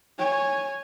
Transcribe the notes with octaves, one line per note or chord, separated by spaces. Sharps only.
C#5 G#5